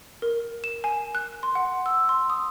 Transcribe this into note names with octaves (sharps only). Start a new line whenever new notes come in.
A#4
E7
G#5
F#6
C6
F#5
E6
C6
D#6